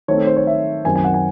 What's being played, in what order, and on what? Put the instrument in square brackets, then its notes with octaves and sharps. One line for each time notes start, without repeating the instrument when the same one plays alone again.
[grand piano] D#3 A3 C4 D#4 C#5
A4
C5
C#5
E5
F#2 D#3 F#3 C4 G#5
G#5
F#5
G#5